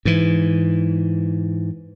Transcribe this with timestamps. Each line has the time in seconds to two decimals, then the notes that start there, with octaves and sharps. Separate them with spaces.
0.05 G#2 E3